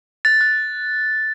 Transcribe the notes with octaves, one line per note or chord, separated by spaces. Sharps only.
F#6 A6
F#6